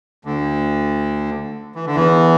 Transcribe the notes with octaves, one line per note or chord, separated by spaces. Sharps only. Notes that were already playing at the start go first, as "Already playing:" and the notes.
D2 D3
E3
D3
E2 E3